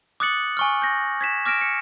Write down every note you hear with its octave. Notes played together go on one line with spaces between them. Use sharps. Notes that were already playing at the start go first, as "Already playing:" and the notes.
D6 D#6 F#6 A6 C#7 F#7
G#5 C#6 F6
G6 A#6
G#6 B6 E7
D6 F6 A#6 D7 E7
C#7